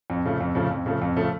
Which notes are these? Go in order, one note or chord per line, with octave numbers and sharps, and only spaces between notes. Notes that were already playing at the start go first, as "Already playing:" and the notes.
F2
C#3 F3 A3
F2
C#3 F3 A3
F2
C#3 F3 A3
F2
C#3 F3 A3